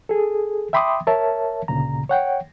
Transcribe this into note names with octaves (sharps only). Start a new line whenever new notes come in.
G#4 A4
E5 G5 B5 C6 D6 D#6
A#4 C#5 E5 A5
D2 A#2 C#3 A#5
C#5 F#5 G5